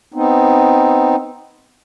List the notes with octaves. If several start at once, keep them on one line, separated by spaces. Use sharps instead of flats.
B3 C4 D#4